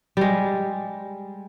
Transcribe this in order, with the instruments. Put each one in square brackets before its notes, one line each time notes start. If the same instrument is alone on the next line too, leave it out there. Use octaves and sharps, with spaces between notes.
[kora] G3 G#3